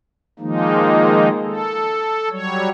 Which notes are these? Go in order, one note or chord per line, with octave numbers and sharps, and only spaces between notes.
D#3 F3 G#3 A#3 D#4
A4
F#3 G3 C#5